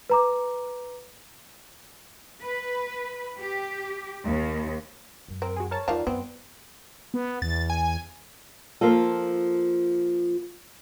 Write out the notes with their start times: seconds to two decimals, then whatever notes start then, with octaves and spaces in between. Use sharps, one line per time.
0.10 B4 A#5 D6
2.42 B4
3.39 G4
4.24 D#2
5.28 F#2
5.42 C4 A#4
5.56 F#4 G#4
5.71 A#4 C#5 A5
5.88 E2 D#3 F3 D5 F5 A5
6.07 F#2 B3 C4
7.14 B3
7.42 E2 A6
7.70 G#5
8.81 F3 A#3 F4 A4